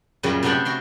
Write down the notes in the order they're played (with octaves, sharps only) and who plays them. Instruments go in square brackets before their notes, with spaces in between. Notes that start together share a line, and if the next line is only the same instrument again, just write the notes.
[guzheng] F#2 A#2 C#3 G3
C3 A3 B3 D4 G5 B5
F#4 G5 C6